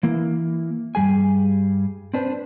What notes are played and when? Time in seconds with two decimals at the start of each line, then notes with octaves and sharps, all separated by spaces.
0.03 E3 A#3 E4
0.95 G2 G3 G#4 G#5
2.14 C4 D4 B4 C5